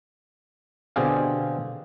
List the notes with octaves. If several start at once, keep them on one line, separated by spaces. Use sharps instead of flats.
B2 D3 C4 G4 G#4 F5